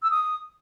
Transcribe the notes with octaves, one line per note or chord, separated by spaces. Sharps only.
E6
D#6